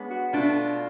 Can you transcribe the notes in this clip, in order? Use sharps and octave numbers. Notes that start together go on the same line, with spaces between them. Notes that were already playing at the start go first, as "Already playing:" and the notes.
Already playing: G#3 B3 D4 G#4 C#5
F#4
B2 A3 D4 F4